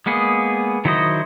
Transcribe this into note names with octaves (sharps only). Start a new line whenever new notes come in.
G#3 A#3 B3 G#4
D#3 F#3 E4 C5 D#5